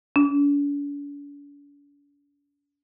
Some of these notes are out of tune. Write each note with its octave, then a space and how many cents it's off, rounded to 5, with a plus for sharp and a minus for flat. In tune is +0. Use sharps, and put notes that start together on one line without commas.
D4 -45